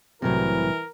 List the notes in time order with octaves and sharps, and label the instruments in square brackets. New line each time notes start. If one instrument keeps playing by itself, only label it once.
[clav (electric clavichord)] C2 A2 C3 [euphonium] E3 [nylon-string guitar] F#3 C4 [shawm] A#4